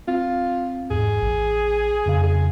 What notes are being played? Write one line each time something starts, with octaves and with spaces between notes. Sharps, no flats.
C4 F4
E2 G#2 G#4
A1
F2 C#3 F5
G#4